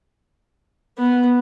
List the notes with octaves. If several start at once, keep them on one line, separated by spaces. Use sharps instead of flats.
B3